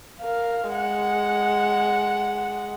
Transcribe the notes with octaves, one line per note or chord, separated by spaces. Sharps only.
A#4 F5
G#3 F#5